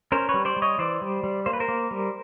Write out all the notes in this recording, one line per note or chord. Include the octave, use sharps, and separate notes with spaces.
C#4 A#4 C5
B4 C#5
G3
C5 D5
G3
C#5 D#5
E3 C5 D5
G3
G3
A#3 C5
B4
A#4 C5
A#3
G3